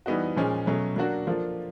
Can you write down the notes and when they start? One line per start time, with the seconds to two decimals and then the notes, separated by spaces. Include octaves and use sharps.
0.06 E3 G3 B3 D#4 F#4
0.36 A#2 F3 G#3 C#4
0.66 B2 F#3 A3 C#4
0.96 F#3 A#3 D4 F#4
1.27 F3 A#3 D4 F4 A4